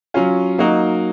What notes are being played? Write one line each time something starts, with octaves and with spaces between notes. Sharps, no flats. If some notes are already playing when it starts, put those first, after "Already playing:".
F#3 C#4 F4
F#3 A#3 D#4 F#4